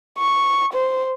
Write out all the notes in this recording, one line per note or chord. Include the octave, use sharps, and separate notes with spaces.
C#6
C5